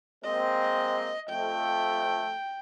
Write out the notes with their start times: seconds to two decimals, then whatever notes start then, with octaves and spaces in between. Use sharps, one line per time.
0.24 G#3 A#3 C4 D#5
1.30 F2 A3 G5